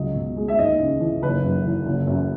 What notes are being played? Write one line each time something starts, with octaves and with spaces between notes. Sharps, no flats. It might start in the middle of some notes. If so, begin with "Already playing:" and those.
Already playing: C#2 F#3 D#5
B2
G#3
E5
D#2 D#5
C#3
E3
F#1 B4
F#2
E3
F#1
F#2